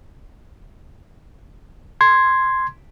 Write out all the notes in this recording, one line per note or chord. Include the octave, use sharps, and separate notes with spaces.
C6 G#6